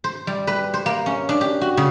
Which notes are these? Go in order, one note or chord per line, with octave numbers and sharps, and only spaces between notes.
C5
G3
B4
C5
A#3
C#4
D4
G4
F#4
C#3